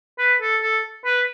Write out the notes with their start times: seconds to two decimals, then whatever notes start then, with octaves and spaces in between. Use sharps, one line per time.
0.18 B4
0.41 A4
0.63 A4
1.05 B4